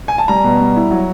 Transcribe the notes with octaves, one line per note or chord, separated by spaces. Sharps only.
G#5
A5
G3 A#5
B2
G3
E4
F#3